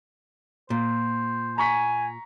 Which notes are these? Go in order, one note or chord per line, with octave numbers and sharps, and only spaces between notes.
A#2 C5
G#5 A#5 C#6 B6